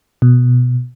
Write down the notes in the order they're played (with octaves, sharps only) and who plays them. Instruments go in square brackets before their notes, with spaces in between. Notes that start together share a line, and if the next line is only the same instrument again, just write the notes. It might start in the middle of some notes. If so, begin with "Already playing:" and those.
[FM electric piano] B2